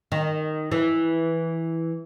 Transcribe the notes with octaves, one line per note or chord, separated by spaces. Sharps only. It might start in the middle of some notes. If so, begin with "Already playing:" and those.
D#3
E3